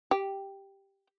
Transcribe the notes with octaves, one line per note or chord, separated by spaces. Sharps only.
G4